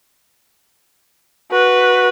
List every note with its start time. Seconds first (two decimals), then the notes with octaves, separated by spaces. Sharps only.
1.52 F#4 B4